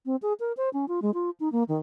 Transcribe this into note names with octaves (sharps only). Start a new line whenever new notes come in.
C4
G#4
A#4
C5
C#4
F4
G#3
F4
D#4
A#3
D#3